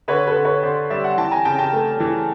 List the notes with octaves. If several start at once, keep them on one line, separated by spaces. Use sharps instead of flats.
D3 B4 C#5
A4 B4
D3
B4 C#5
D3 C5 D5
G3 D5 E5
E5 F#5
E3 G5 A5
G#5 A#5
C#3 G5 A5
G5 A5
A3
E3